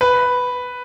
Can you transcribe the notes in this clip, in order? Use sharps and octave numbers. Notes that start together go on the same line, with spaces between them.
B4